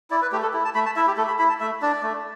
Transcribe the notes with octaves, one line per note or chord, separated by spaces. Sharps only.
E4 D5
B4
A3 G4
A4
E4
A5
A3 B5
A5
E4 E5
G4
A3 A4
B5
E4 B5
A5
A3 E5
D4 D5
A3